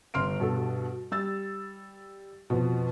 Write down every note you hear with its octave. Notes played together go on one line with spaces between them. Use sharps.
G1 C6 F6 D7
G2 B2 A4
G3 E6 A6
F2 B2